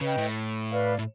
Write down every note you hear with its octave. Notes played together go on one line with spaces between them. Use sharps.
C#3 B4 D#5 G5
A2
B4 D5 F5
A2